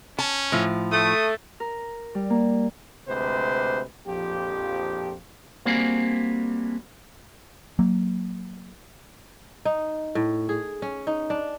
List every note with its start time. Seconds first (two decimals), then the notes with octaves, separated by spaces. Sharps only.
0.19 C#4 A5
0.52 A2 F3
0.92 A3 D#6
1.60 A#4
2.15 G3
2.30 A#3
3.09 D2 C3 G#3 B4 C5
4.08 A#1 F2 F3 G4
5.65 G3 A#3 C4 D4 F#4 G#4
7.79 F#3 A#3
9.65 D#4
10.15 A2
10.49 G#4
10.82 C#4
11.07 D#4
11.30 D4